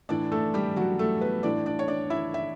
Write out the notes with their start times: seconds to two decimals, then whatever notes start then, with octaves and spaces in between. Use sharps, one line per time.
0.09 A2 E3 D4 D5
0.32 A3 A4
0.54 G3 G4
0.76 F#3 F#4
0.99 A3 A4
1.21 B3 B4
1.43 A2 E3 D4 D5
1.66 D4 D5
1.79 C#5
1.88 D4 D5
2.10 E4 E5
2.34 E5